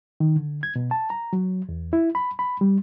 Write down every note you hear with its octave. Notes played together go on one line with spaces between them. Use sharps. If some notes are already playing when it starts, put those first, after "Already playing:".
D#3
D3
G#6
B2
A5
A#5
F#3
E2
E4
B5
B5
G3